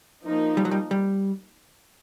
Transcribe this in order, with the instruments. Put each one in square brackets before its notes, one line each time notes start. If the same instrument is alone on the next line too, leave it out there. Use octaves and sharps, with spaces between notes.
[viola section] F3 A#3 D#4
[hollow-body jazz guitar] G3
F#3
G3
G3